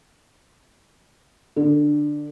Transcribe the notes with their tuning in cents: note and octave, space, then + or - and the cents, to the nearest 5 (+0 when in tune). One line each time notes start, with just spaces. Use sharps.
D3 +15